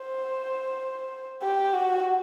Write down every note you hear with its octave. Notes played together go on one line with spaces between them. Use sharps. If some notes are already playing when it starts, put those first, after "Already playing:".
Already playing: C5
G4
F#4